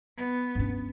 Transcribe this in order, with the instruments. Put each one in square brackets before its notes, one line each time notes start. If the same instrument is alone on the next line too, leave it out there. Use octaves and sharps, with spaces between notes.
[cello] B3
[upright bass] G2 C#4